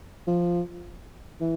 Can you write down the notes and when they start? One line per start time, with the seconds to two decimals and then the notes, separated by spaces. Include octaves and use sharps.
0.27 F3
1.41 E3